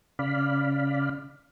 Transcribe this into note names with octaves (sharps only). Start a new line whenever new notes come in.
C#3 D5 F5 B5